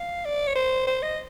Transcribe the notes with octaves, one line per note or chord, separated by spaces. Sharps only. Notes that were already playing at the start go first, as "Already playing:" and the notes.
Already playing: F5
D5
C#5
C5
C5
D#5